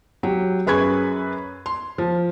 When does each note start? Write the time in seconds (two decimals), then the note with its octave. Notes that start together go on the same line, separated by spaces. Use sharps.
0.23 F#3 G4
0.67 F#2 G#4 B4 B5 C#6 G#6
1.66 C6
1.98 F3